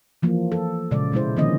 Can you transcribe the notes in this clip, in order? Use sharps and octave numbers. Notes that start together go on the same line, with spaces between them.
E3 F3 A#3
A4
A#2 C#3 G#3 D5
B2 G#3 E4 C5
D3 D#3 F3 A#3 C#4 D#5